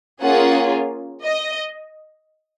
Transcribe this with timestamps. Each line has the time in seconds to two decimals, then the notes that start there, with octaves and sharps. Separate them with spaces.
0.22 A#3 C#4 F4 G#4 F#5
1.24 D#5